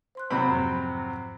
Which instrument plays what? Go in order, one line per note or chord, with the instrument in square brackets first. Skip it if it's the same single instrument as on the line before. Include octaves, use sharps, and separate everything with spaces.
[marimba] C5 C6 F#6
[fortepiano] C3 F#3 C4 [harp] B5
[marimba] F2 G#2 F3